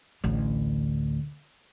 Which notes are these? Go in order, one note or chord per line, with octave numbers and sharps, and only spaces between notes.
A1 D2